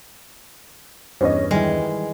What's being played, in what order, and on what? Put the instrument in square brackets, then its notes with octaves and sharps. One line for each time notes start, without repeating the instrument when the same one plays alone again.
[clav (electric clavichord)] E2 G2 [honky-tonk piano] C#4 C#5 D#5
[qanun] D#3 E3 [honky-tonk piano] G3 [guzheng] G#3